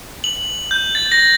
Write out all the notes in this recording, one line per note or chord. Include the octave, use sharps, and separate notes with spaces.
F#7
G6
A6
A#6